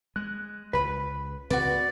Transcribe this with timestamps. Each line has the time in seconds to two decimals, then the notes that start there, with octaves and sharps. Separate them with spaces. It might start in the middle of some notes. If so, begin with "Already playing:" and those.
0.16 G#3 F#6
0.73 C#2 B4 B5
1.50 C#2 C#3 C4 F#4 B4 D5